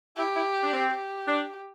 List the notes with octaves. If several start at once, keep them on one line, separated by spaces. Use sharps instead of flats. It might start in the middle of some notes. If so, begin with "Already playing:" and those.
E4 G4
E4
D4
C4
G4
D4